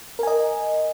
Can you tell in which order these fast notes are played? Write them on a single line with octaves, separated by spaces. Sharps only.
A#4 G#5 D#5